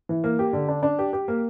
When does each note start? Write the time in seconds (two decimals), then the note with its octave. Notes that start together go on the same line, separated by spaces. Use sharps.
0.09 E3
0.24 A#3
0.39 G4
0.53 D3
0.68 D4
0.83 D4
0.99 G4
1.13 G4
1.28 A#3